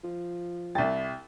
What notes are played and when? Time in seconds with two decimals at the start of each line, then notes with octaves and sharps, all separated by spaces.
0.04 F3
0.75 C2 G5 A6